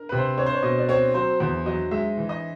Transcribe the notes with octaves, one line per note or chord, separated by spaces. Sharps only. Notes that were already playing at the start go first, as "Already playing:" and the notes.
Already playing: A#4
C3 B4
C5
C4 C#5
C5
C#5
B2 D#5
D5
C4 C#5
F#3 C5
E2 C5
F#3 D#5
G#3 E5
E3
D#5